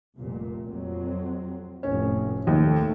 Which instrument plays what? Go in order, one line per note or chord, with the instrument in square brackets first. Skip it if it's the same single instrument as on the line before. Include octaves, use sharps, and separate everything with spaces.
[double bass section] F1 C2 A#2
F2 F#3 C4
[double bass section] F1 A2 [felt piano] C#4
[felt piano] D#2 [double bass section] A3